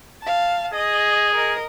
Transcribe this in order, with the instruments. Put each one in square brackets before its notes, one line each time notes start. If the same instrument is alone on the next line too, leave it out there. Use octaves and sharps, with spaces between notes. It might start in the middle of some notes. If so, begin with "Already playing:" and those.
[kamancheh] F5 A5
[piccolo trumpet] G#4 [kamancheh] D#5
[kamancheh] A#4 D#5